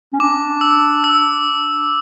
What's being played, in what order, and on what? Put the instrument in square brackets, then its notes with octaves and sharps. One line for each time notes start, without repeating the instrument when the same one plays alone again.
[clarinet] C#4
[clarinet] D4 [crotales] D6
[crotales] E6
E6